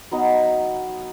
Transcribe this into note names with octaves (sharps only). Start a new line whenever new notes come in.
F#3 B3 D#4